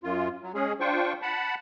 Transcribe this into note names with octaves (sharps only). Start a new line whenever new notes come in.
F#2 F4
F#3
G#3 C#4 G#4
D4 F4 C5 G5 C#6
F#5 A5 B5